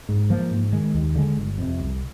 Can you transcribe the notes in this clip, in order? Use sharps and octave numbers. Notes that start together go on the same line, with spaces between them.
G#2
F3 A#3
G#2
D#3 G#3
D#2
D3 F3 G#3
G1
F2 C3
C2